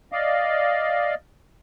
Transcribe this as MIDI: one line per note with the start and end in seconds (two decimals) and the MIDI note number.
0.12 1.15 74
0.12 1.15 75
0.12 1.15 77